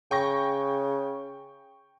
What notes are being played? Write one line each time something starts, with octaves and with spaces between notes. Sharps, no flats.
C#3 G5 C#6 A#6